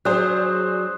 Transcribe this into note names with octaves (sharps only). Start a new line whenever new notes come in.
F#3 D4 G#4 C5 D#6 F#6